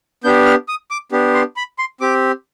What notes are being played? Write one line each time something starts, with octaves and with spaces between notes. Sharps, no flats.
B3 D4 G4 G6
F6
D#6
D6
B3 D4 G4
C6
B5
C6
C4 G4 D6